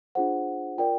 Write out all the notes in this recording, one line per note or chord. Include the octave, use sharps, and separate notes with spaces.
D4 F4 G#4 C5 F#5
F4 A#4 D5 G5